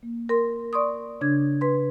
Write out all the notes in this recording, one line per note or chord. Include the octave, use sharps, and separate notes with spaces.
A#3
A#4 C6
D5 C6 C#6 D#6
C#3 D4 G#6
B4 C6